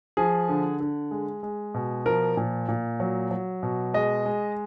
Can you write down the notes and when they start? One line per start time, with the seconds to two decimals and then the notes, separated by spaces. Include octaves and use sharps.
0.17 F3 G#4
0.49 D3
0.80 D3
1.11 G#3
1.43 G#3
1.74 B2
2.06 F3 A#4
2.37 A#2
2.68 A#2
3.00 F#3
3.31 F#3
3.63 B2
3.94 G#3 D#5
4.26 G#3